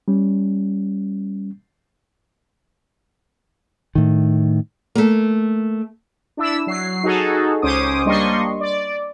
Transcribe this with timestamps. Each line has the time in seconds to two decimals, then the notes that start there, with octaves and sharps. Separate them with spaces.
0.08 G3 C#4
3.95 A2 D#3
4.95 A3 A#3
6.37 D4 E4 E6
6.67 F#3 C7
7.03 D#4 F#4 G#4 A4
7.62 C#2 C#4 C5 D6 D#6
8.06 G3 A#3 D4 D#5 C6 C#6
8.60 D5